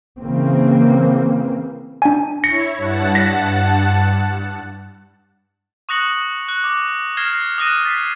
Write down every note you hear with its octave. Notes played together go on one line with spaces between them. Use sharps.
C#3 E3 A#3 C4
D4 G#5
E4 C#5 A#6 C#7
G2 F#5 A5
A#6 B6
C#6 D#6 F#6 A#6 C#7 F#7
F#6
D6
F6 G#6 A#6 C7 E7
D#6 F6 F#6 A#6 D#7 E7
A6 B6 C7